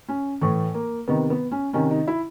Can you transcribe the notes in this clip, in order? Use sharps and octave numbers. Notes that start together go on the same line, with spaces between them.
C#4
A2 E3 A3
A#3
C3 D#3 B3
B3
C#4
C3 D#3 C#4
D#4
E4